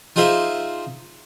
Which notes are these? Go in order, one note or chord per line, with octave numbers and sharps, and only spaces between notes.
D#4 F4 G#4 C5 E5 F5